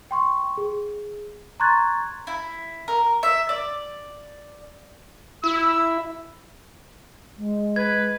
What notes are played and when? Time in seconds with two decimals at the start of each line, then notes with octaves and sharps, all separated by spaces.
0.11 G5 C6 C#6
0.58 G#4
1.60 A#5 C6 C#6 F#6 G#6 A6
2.27 E4
2.88 A#4
3.23 E5
3.49 D5
5.44 E4 E6
7.38 G#3
7.76 B4 G#6